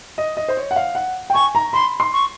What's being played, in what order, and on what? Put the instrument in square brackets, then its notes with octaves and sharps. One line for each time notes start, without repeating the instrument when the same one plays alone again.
[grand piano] D#5
D#5
C5
C#5
F#5
F5
F#5
G5
[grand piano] G#5 [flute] C#6
[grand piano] A#5
[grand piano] B5 [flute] C6
[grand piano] C6
[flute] C#6